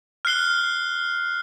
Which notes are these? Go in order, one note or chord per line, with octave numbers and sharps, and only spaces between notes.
F6 F#6 C7 G7